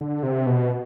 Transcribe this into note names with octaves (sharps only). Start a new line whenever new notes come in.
D3
C3
B2